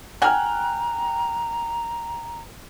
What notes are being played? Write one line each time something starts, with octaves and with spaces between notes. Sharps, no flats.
F#4 G5 G#5 A#5 F6 F#6